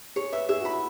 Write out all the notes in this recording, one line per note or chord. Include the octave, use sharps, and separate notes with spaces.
G#4 C#5
B4 E5
G#4 E5
F#4
E4 B5